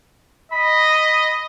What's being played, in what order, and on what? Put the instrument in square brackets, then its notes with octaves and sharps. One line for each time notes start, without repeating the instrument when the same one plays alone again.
[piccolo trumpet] D#5 [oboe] B5
[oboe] B5